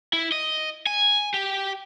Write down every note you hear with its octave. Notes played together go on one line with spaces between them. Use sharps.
E4
D#5
G#5
G4